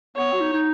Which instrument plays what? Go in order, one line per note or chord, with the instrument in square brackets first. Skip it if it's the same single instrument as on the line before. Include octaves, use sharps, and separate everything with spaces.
[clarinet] B3 [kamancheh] C#5
[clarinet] F#4
D#4
D#4